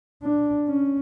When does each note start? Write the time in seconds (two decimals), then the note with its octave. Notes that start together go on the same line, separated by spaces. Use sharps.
0.23 D4
0.67 C#4